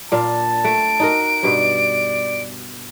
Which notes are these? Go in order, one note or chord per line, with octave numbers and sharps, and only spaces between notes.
A#2 D4 F5 A5
A3 D7
D#4 F#4 A#4
G2 B2 D5